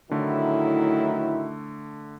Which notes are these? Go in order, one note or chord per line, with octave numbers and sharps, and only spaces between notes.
A2 D3 D#3 F#3 A3 E4